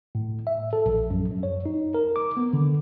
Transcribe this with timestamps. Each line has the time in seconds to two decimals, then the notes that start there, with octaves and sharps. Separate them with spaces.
0.15 A2
0.47 E5
0.73 A4
0.86 A#1
1.10 F#2
1.31 F#2
1.43 C#5
1.66 D#4
1.94 A#4
2.16 D6
2.37 B3
2.53 D3